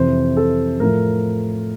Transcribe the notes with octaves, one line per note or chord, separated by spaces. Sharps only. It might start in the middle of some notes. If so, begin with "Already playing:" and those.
Already playing: F2 C3 E3 C5
A4
A2 F3 A3 A#4